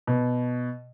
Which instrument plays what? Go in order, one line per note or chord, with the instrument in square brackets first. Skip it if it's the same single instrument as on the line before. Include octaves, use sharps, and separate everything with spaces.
[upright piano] B2